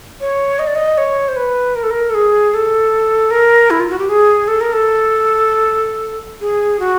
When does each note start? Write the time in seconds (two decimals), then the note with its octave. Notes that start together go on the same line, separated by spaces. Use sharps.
0.21 C#5
0.59 D#5
0.67 D5
0.75 D#5
0.98 C#5
1.28 C5
1.36 B4
1.76 A#4
1.83 A4
1.91 A#4
2.10 A4
2.14 G#4
2.54 A4
3.31 A#4
3.70 E4
3.80 F4
3.90 F#4
3.99 G4
4.09 G#4
4.48 A4
4.61 A#4
4.73 A4
6.41 G#4
6.79 F#4